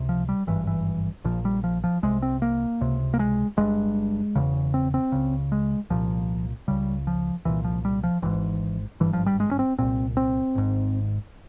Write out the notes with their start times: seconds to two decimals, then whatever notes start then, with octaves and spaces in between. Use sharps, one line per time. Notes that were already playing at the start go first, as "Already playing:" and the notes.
Already playing: C#2 C3
0.09 F3
0.29 G3
0.47 G#1 G2 E3
0.67 E3
1.24 A#1 A#2 F3
1.45 G3
1.64 F3
1.84 F3
2.02 C2 C3 G#3
2.22 C4
2.42 A#3
2.81 C#2 C3
3.14 A#3
3.19 G#3
3.57 G1 G2 G#3
4.35 E1 E2 C#3
4.74 C4
4.94 C4
5.12 C#2 C#3
5.52 G#3
5.90 C2 A#2 F3
6.68 C#2 C#3 G3
7.07 F3
7.45 C2 A#2 E3
7.64 F3
7.85 G3
8.04 F3
8.22 G#1 G#2 E3
9.00 G#1 G2 E3
9.13 F3
9.26 G3
9.40 G#3
9.51 C#4
9.59 C4
9.79 C2 A#2 C4
10.17 C4
10.55 G#1 G#2